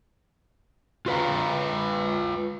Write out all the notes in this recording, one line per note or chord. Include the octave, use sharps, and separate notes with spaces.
F4 F#4 B4 C#5 F5 A#5